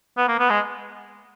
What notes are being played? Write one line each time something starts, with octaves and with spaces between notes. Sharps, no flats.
B3
A#3
B3
G#3